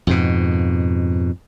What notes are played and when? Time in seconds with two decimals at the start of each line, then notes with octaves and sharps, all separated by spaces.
0.07 F2 G#2 B2